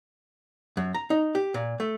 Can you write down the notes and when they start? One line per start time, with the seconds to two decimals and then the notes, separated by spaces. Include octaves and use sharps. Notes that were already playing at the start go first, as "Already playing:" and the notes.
0.77 F#2
0.94 A#5
1.10 D#4
1.35 G4
1.54 A#2
1.80 A3